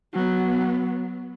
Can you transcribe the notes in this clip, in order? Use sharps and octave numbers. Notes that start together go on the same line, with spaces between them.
F#3 B3